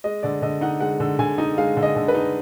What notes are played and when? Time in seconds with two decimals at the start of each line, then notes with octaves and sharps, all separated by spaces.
0.04 G#3 D#5
0.23 D3 D5
0.42 D3 D#5
0.61 D#4 F#5
0.81 G#3 F#5
1.00 D3
1.19 D3 G#5
1.38 D#4
1.57 G#3 F5
1.77 D3
1.83 D#5
1.96 D3
2.08 B4
2.15 D#4